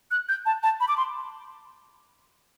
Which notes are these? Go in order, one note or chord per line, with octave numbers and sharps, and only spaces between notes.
F#6
G6
A5
A5
B5
D6
C6